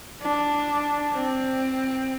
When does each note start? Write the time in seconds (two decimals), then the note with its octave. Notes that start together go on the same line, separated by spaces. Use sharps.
0.22 D4
1.14 C4